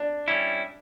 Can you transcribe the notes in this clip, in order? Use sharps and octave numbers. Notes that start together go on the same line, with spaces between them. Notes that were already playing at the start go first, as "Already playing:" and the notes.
Already playing: D4
G3 C#4 E4